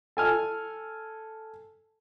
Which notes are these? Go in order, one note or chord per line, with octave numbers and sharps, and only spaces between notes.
A4 G#5 F6